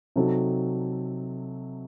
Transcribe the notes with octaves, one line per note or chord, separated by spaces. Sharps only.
C3 F#3 C4 D#4 A4